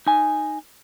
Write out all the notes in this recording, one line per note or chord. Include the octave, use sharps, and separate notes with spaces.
D#4 G#5